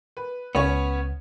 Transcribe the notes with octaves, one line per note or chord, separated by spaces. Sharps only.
B4
C#2 B3 C#4 C#5